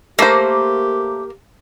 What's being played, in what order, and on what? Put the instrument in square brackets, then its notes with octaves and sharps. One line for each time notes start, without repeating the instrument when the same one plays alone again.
[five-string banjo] A3 C5 [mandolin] A#3 [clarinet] G4